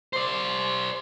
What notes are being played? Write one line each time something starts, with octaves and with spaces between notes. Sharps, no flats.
C5 D5